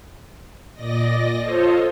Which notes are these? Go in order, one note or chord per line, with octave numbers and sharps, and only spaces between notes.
A#2 D5 D#5 A#6
F4 A4 C5 C#5 D#5